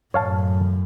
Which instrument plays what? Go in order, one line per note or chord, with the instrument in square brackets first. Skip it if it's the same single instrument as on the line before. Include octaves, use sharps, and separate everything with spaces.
[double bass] F#2 A2 [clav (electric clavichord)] C#5 F5 A5